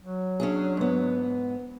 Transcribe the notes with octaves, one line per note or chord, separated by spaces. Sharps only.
F#3
C#4 D4 G#4
G#2 B3